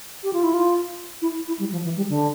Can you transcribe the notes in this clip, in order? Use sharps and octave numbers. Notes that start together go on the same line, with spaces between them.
G4
F4
E4
F4
E4
E4
G3
F3
E3
G3
D3